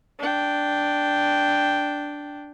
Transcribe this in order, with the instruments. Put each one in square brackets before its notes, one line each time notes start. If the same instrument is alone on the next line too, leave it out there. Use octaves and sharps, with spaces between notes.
[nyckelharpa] D4 G5